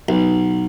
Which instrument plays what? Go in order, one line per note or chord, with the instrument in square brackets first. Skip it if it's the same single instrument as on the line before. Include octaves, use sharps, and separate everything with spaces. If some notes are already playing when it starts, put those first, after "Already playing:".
[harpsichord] B1